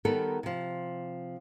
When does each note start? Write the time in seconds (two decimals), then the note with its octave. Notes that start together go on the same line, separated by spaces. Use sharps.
0.05 D#3 G3 B3 A4 A#4
0.43 C3 F3